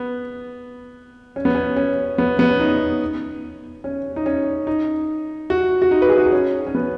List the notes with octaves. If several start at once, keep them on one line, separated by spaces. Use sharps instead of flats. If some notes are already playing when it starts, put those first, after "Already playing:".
Already playing: B3
C#4
B3
C#4
C#4
B3
B3
C#4
D#4
C#4
D#4
C#4
D#4
F#4
F#4
D#4
B4
G#4
F#4
D#4
C#4
C#4
B3